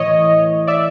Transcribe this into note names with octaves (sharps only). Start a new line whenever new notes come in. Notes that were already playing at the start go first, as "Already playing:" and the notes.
Already playing: A2 E3 C#5 D#5
D5 E5